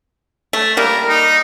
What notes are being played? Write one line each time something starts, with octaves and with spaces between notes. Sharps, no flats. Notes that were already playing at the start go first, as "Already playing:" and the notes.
A3
G3 A#3 A#4
D#4